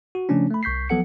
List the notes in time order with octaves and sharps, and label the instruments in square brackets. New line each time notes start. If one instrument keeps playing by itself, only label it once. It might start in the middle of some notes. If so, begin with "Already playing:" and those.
[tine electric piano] F#4
C#3 F3 A3 C#4 D4
A3 B5
C2 C#6 G6 B6 C7
F3 F#3 B3 A4 F#5 C#7